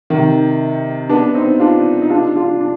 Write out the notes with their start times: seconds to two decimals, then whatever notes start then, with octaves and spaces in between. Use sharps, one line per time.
0.10 C3 D#3
1.09 B3 D4
1.35 C4 D#4
1.60 D4 F4
2.02 D#4
2.10 D4 F4
2.36 D4 F4
2.60 D4